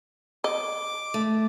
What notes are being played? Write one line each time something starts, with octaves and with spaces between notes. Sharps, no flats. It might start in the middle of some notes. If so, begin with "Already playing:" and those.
D#5 D6
A3